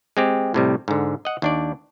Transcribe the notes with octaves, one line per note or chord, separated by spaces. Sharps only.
G#3 C4 G4
A2 C3 G3
G#2 D3
D#5 F#5
D#2 D4 D5